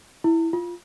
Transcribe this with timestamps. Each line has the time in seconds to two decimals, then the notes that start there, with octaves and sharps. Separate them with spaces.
0.24 E4
0.53 F4